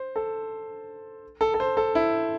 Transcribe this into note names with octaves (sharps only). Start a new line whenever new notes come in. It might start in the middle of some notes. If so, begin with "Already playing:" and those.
Already playing: C5
A4
A4
A4
C5
A4
E4